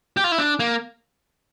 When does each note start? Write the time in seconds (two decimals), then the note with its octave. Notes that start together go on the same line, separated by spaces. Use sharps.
0.17 G4
0.24 F4
0.32 E4
0.39 D4
0.59 A#3